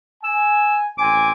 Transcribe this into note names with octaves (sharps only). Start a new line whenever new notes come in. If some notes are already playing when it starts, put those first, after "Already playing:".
G#5 E6
A1 C4 G#5 D6